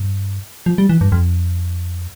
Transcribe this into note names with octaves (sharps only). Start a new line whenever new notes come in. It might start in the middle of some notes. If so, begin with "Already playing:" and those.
Already playing: G2
F3
G3
E3
G2
F2